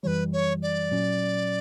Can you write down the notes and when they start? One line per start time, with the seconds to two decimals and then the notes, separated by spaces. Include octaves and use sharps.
0.03 F#2 E3 G3 B4 C#5
0.33 C#5
0.62 D5
0.91 A#2 F#3 C#4